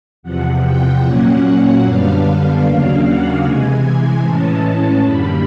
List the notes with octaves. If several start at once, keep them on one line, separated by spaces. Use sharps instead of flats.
E2 C3 F3 F#5
G5
A#2 F#3 A#3 C#4 F#5
F#2 D3 G3 B3 D4 F5
D#2 C#3 F#3 A#3 D4 F5
F#5
C3 E3 G#3 G#5
A2 E3 G#3 C#4 A5
F#2 D3 G3 A#3 B5